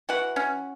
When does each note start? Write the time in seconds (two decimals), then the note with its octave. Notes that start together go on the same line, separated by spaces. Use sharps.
0.09 E3 F#4 F#5
0.36 C#4